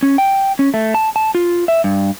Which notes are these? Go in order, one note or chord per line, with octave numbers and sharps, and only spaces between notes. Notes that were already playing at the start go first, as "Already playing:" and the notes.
C#4
G5
C#4
A3
A5
A5
F4
E5
G2